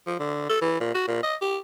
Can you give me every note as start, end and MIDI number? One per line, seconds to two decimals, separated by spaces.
0.07 0.18 53
0.19 0.47 50
0.49 0.59 69
0.62 0.78 52
0.80 0.94 46
0.94 1.02 66
1.07 1.21 46
1.23 1.35 75
1.41 1.58 67